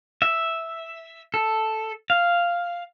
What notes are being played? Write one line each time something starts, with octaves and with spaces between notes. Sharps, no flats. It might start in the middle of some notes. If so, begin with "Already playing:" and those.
E5
A4
F5